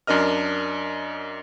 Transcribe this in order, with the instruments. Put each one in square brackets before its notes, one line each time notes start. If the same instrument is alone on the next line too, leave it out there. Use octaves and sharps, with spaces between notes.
[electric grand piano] F#2 D4 A#4 D#5 F6